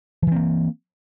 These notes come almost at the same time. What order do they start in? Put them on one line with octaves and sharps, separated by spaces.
F3 E3 C4 A#3